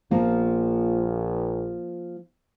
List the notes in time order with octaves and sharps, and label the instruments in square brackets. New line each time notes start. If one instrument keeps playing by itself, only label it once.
[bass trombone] A#1 [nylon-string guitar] F3 A#3